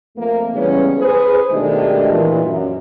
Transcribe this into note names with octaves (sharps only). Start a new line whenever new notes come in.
F2 A3 A#3
C#3 E3 G3 G#3 B3 C#4
G#4 B4 C5
B2 D#3 G#3 A3 D4 G4
A#2 E3
F#2